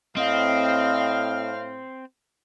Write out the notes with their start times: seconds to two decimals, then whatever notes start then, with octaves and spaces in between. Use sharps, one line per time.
0.17 A2 C4 D#5 F5 F6